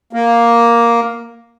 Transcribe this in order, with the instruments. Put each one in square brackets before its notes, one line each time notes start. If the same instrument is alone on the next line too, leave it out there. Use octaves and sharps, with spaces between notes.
[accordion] A#3